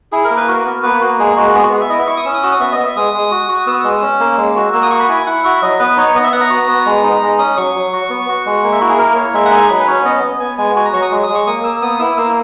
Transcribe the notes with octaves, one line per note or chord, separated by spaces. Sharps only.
E4 G#4
A#4
A#3
B4
F#4 A#4
B3
A#3 B4
A#3 F#4
G#3 G#4
G#3 F#4
B3 G#4
F#4
B3 G#4
E5
E4 D#5
E5
E4 C#6
D#6
C#4 E6
D#6
F#4 E6
D#6
B3 E5
D#5
B3
E5
G#3 D#6
G#3
F#4
F#4
B3 E6
G#3
C#4
A#3
G#3
F#4
A#3 E6
D#6
F#4 C#6
B5
E4 G#5
E4 F#5
F#4 E5
F#3 D#5
B3 B4
D#4 C#5
B3 D#5
E5
B3 F#5
A#5
F#4
B3
G#3
D#4
G#3
C#4 D#6
F#3 C#6
F#3
F#4
B3
F#4
G#3
A#3
E5
E4 F#4
G#4
A#3 A#4
A#3 C#5
G#3 E5
F#5
D#4 G#5
F#3 B5
B4
C#4 C#5
B3 D#5
B3
B3 G#5
G#3 G#5
F#4 G#5
A#5
F#3 C#6
D#6
G#3
D#6
G#3
C#6
A#3 D#6
A#3 E6
B3 D#6
E4 E6
A#3 E6